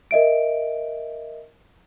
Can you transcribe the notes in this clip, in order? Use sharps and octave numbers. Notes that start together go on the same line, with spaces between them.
A#4 D#5 E5 D7